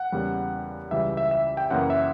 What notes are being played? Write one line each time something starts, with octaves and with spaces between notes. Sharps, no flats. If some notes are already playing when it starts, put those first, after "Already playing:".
Already playing: F#5
E2 C#3 G3 A#3
C#2 C#3 E3 G3 E5
E5
E5
G5
F#2 C#3 E3 A#3 F#5
E5